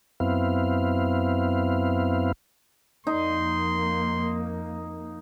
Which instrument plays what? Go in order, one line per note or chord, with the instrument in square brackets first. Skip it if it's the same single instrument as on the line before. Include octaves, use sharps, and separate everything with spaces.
[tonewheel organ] F#2 B3 C4 E4 F5
[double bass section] F2 A#3 [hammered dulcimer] D#4 [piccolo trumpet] C6